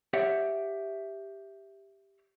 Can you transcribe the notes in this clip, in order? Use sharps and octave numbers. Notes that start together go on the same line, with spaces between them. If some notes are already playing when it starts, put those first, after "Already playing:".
G4 C#5 E5 F#5